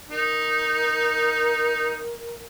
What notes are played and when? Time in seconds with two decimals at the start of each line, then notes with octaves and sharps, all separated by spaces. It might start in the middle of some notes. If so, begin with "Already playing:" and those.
0.11 D#4 A#4